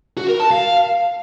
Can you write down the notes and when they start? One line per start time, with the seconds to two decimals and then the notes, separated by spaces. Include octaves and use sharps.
0.17 F#4
0.28 A#4
0.40 A5
0.51 F5